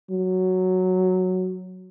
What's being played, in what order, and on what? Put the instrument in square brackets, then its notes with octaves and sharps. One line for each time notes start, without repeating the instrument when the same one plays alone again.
[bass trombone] F#3